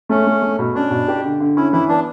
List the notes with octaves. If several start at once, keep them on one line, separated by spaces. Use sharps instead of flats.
A3 C#4
A3
A3
B2
C#4 D4
B2
G4
D3
D3
C#4 E4
E3 E4
B3 D4